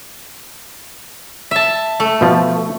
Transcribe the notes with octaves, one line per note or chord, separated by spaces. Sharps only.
E5 A5
A3
B2 F3